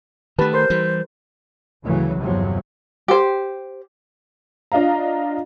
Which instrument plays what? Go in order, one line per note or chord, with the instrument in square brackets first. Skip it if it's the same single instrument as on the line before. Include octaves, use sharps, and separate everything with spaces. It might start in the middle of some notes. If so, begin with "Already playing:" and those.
[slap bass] D#3 A3 [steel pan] G4 B4 A5
[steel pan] A#4 C6 [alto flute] C5
[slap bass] E3 G3
[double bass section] D2 A2 C#3 E3 F#3
G1 E2 C3 F3 F#3
[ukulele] G4 C5
[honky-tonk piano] D4 F4 D#5 F5 A#5